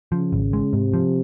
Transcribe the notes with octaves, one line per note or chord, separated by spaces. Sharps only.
C#3 F3
G#1
G#3
G#2 C3
F3